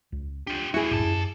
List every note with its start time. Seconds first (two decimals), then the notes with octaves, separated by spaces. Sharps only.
0.12 C#2
0.47 D4 F4 G4
0.74 G3 E4 F#4 G#4
0.91 B1 F#2 A2 G4 A5
1.04 F#2